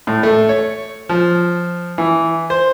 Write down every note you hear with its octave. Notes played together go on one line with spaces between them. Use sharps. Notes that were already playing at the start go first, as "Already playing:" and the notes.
A2
A3
C#5
F3
E3
C5